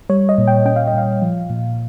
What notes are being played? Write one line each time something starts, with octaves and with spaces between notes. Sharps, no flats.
G3 C#5
D#5
A#2
G5
C#4 G5
F5
D#5
A#2 F5
F3
A#2